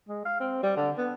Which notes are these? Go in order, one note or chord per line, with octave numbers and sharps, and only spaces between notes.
G#3
F5
C4
G3
D3
B3